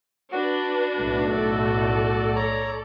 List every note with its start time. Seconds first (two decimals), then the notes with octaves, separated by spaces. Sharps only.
0.32 D4 F#4 B4
0.96 B1 A2 A3
1.31 A4 D5
2.36 C#5 A#5